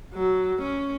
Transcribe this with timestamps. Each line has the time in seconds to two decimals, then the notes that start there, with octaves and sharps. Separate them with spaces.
0.14 F#3
0.62 C#4